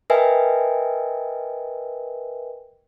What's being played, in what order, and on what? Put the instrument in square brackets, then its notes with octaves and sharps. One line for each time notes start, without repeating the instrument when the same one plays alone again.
[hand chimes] A#4 B4 D#5 E5 G5 G#5